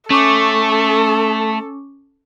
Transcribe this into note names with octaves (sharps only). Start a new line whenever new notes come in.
A3 C#4 A4 C#6 D6